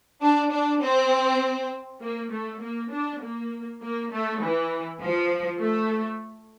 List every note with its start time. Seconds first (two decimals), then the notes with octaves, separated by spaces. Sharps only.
0.22 D4
0.51 D4
0.81 C4
2.01 A#3
2.32 A3
2.61 A#3
2.92 D4
3.21 A#3
3.82 A#3
4.12 A3
4.41 E3
5.02 F3
5.61 A3